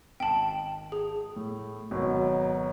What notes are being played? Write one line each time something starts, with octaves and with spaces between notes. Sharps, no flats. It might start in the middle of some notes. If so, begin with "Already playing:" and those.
G#1 G5 A5 F#7
G#4
A2
G#1 B2 F#3